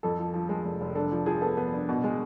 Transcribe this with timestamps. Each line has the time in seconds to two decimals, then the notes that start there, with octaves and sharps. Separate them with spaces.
0.03 F2 A4
0.19 F3
0.34 F3
0.49 G#3
0.65 F1
0.81 F1
0.95 D4 A4
1.12 F3
1.26 F3 G#4
1.42 B3 A4
1.57 B3
1.74 D4
1.89 B2
2.04 G#3